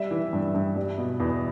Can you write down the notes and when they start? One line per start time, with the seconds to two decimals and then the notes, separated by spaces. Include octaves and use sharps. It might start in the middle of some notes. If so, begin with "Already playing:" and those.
Already playing: G3 E5
0.11 E3
0.33 G2
0.55 G2
0.76 G3
0.98 B2
1.20 E2